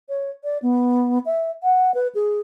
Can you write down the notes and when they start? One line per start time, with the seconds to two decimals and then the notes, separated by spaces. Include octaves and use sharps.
0.09 C#5
0.44 D5
0.62 B3
1.26 E5
1.63 F#5
1.94 B4
2.15 G#4